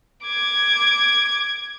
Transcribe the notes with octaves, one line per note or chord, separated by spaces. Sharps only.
D6 G#6